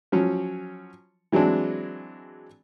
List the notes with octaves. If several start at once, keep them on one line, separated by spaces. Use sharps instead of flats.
F3 F#3 C#4
E3 F#3 G#3 C4 D4